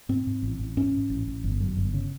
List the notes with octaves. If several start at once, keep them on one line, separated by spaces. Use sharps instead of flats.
G#2 C4
G#2
A1
A1
G#2 C#4
G#2
A1
A1
G1
F#2
G1
C#3